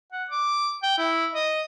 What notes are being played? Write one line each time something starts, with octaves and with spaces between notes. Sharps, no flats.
F#5
D6
G5
E4
D#5